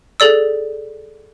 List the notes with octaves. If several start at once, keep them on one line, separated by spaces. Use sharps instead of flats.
G#4 A4 D5 E6